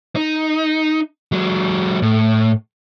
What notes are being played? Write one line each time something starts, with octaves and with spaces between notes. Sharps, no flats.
D#4
F#3 G#3
A2